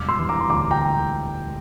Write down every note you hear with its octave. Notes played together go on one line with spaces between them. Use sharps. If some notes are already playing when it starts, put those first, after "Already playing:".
Already playing: E1 G3 D6 F6
C6 E6
E3
A#5 D6
C6
D2 A#5 D6
G5 A#5